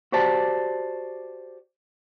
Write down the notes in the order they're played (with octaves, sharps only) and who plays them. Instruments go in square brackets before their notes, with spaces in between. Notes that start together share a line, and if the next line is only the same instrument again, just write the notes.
[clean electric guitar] F#4 G4 C5 D5 A5